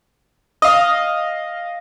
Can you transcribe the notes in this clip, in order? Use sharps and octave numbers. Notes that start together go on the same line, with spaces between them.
D#5 F5 D#6